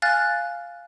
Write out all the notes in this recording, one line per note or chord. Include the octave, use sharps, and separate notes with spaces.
F5 G#5 F6 F#6 A6